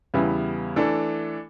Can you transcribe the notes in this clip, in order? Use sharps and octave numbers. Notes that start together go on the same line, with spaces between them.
E2 C#3 G3 B3 E4
E3 A3 D4 A4